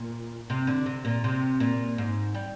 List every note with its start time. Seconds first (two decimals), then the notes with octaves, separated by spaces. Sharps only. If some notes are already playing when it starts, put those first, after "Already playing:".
Already playing: A#2
0.50 C3
0.67 D3
0.86 C3
1.05 A#2
1.24 C3
1.60 A#2
1.98 G#2
2.35 G3